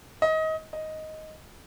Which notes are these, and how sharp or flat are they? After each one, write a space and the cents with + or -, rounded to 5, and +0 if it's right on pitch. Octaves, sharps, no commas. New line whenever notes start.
D#5 +25
D#5 +5